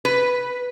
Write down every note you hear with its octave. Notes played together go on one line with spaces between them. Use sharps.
B4